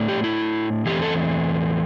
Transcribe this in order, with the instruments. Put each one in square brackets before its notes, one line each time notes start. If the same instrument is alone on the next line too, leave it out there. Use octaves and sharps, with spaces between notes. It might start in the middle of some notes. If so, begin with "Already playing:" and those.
Already playing: [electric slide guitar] A2 A3 D4
G4
E4
E2 E3 A3 C4 G4
A4